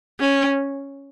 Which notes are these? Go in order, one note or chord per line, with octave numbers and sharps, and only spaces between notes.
C#4